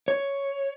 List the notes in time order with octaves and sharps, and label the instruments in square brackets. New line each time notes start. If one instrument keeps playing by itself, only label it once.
[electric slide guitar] C#5